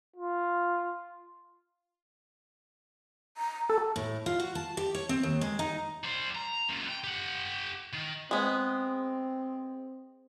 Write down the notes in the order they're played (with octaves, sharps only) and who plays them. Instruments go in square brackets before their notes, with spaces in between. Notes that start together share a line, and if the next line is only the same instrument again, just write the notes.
[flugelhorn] F4
[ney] A#5
[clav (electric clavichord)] A4 [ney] A5
[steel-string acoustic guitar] A2
F4
F#4
A5
G4
C#5
C4
D#2
G#3
D#4
[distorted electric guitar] G3 C5
A#5
F#2 A#2
G5
G4 F#5
D#3
[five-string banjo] G#3 B3 [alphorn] C4